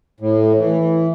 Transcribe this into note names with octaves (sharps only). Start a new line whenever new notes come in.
A2
E3